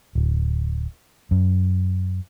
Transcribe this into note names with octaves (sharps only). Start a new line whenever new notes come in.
D1
F#2